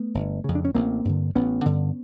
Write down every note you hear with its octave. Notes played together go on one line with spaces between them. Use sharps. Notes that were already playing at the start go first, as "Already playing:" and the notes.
Already playing: A3 B3
G1
F2 C#3
D4
C#4
A1 A#3 C4
G2 D3
A1 B3 C#4
G2 D3